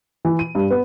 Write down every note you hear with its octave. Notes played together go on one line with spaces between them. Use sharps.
E3
D#7
G2
B3